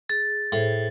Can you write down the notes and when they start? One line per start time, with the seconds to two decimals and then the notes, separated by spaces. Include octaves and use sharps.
0.09 G#4 A6
0.52 A2 G#4 C5